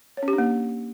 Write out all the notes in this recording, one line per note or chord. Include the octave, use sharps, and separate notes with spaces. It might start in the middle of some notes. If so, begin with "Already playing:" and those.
C#5
C#4
G4
D4
A#3